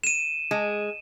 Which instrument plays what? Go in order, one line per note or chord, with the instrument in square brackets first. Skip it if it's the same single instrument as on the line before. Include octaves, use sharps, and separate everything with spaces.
[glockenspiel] D#7 E7
[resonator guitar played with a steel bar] G#3